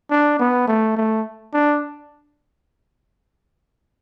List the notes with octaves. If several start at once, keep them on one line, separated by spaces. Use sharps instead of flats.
D4
B3
A3
A3
D4